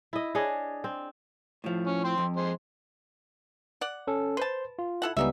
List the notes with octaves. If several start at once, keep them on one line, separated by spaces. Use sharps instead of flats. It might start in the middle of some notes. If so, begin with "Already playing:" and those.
E4 D#5
D4 G#4 C#5 D#5
C4
A2 F3
C#4
C4 C6
F2
G#3 C5
D5 F#5
C#4 A4
B4 C5 A5 C6
F4
E4 A4 F#5
C#2 E3 G3 B3 D#4 E5